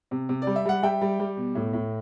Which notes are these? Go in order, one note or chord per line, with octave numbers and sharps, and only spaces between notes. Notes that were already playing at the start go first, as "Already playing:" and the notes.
C3
C3
D5
G3
E5
G3 F#5
G3 E5 G5
G3
G3
B2
A2
A2